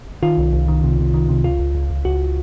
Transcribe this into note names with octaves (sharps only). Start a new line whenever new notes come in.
D#3 F4
C2
C2
D#3
C3
C3
D#3
C3
C#2 F4
C#2
C#2
C#2
C#2 F#4